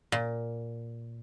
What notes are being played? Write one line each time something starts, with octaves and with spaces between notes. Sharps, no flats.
A#2